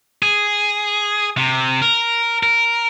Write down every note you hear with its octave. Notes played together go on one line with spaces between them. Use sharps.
G#4
C3
A#4
A#4